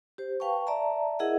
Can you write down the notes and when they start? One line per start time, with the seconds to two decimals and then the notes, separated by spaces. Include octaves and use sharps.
0.18 G4 C5
0.40 B4 F5 G5 A5 C#6
0.67 D5 E5 A5 A#5
1.19 E4 G#4 A#4 D#5 E5 F#5